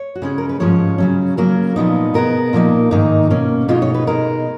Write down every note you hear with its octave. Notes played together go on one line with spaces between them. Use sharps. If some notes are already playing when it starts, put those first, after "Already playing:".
Already playing: C#5
F#4
C#3 G#3 C#4 G#4
A#4
B4
G#2 F3 G#3 C#4 C#5
C#3 F#3 C#4
C#3 F#3 A#3 C#4 A#4
A#2 F3 B3 D#4
B2 G#3 B3 A#4
A#2 F3 A#3 D#4
G#2 D#3 A#3 D#4
B2 A#3 C#4
B2 G#3 D#4 F4
C#5
B4
B2 G#3 D#4 A#4